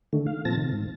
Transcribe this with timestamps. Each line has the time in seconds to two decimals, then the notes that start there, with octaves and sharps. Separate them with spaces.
0.13 D3 D#3 A3
0.26 F5
0.45 A#2 F3 C4 A5 A6 A#6
0.57 C3 D#3
0.72 G#2